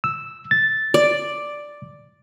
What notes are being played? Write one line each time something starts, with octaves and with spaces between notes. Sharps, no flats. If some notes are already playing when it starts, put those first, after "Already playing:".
E6
A6
D5